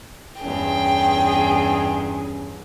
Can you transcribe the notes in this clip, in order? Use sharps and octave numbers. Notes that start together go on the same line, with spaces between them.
E2 G2 C#4 G#4 G5